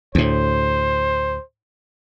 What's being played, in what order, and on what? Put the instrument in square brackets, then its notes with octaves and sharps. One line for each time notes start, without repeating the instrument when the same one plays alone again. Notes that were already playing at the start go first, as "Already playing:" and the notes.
[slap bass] D2 A2 [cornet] C5